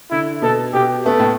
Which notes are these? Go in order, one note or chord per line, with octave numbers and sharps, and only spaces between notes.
D3 E4
B2 A4
B2 G4
A3 B3
A2